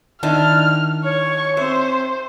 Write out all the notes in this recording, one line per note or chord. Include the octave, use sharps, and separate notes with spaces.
D#3 D4 E4 F6
C#5 C#6
C4 C5 E5